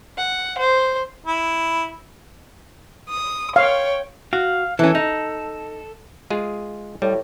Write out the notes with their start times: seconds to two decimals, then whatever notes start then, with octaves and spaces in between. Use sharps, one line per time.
0.17 F#5
0.58 C5
1.26 E4
3.10 D#6
3.56 C#5 F5 G5
4.33 F#4 F5
4.79 E3 C#4 A4
4.95 D#4
6.30 G#3 F4 G#4
7.02 A2 G3